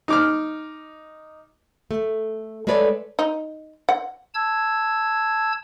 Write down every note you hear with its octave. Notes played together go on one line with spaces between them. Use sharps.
D#4 D6 F6
A3
G#3 A3 A4 B4 C#5 D5
D#4
F#5
A5 E6 G#6